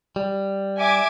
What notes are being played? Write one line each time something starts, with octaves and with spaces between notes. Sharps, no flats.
G3
E5 G#5 D6